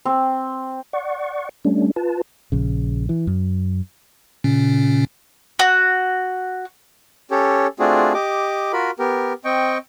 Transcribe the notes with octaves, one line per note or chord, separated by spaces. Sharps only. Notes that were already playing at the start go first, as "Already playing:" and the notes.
C4
D5 F#5 C#6
G3 A3 C#4 D4
F4 B4 A5
A#1 C#3
E3
F#2
A#2 C#3 C#4
F#4
C#4 G4 A4 C#5
A3 C4 D4 F4 F#4 G#4
G4 D#5 D6
F4 F#4 A#4 B5
B3 G4 A#4
C4 D#5 G5 C#6